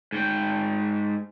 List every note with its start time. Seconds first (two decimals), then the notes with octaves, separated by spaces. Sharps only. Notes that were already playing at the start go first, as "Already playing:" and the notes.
0.13 G#2 G5